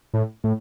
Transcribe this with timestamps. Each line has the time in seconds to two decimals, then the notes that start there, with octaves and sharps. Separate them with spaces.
0.14 A2
0.44 A2